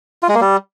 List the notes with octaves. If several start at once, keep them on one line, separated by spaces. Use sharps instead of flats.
F4
G#3
A#3
G3